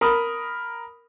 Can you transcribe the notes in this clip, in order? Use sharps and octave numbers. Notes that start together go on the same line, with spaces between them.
A#4 B5 D#6